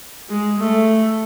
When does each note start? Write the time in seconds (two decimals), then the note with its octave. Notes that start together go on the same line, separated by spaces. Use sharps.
0.29 G#3
0.59 A3